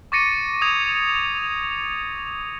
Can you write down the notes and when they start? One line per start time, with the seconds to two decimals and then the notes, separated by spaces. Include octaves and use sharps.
0.12 C#6 D6 A6 A#6 C#7 D#7
0.62 D#6 G#6 F7